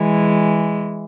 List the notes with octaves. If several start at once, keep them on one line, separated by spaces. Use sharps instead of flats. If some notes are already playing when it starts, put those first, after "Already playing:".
Already playing: E3 G#3